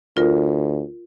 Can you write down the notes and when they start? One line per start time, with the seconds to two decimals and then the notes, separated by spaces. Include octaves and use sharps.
0.17 D2 F4 A#4